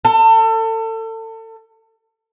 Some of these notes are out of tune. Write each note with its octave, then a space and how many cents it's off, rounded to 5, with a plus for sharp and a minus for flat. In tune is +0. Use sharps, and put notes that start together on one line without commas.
A4 +30